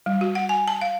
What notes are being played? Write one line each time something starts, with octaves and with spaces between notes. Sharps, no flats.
G3
F#4
F#5
G#5
A5
F5